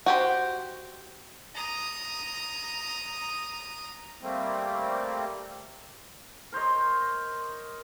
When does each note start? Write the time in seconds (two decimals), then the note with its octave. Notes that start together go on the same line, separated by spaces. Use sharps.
0.06 F#4 G4 C5
1.55 A#5 D#6
4.22 G3 A3 A#3 C4
6.52 A#4 C5 C#5 D#5